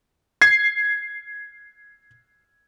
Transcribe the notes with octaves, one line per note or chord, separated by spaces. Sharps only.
G#6 C7